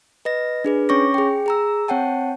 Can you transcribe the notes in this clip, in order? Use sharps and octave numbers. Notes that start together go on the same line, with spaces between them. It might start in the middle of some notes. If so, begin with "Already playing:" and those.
B4 D#5 A#6
D4 G#4 B4
C#4 C#5 C#6 D6 A#6
G#4 G5
G#4 A#5 E6
C4 C#5 F#5 G5 A5